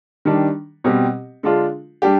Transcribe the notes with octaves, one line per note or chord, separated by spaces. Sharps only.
D#3 G3 D4
B2 G3 C4 G4
D3 G#3 D4 F4
G3 D4 G4